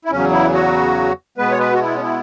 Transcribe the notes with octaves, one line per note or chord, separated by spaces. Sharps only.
E4
E2 C#3 F#3 C#4
E4
F#4
B2 G#3 B3 B4
C#5
B4
F#4
E4
C#4
E4